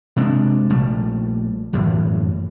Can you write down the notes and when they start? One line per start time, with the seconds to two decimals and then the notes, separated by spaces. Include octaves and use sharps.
0.16 C3 G#3 D4
0.70 A#1 G3 A3
1.73 G1 F#2 A2 E3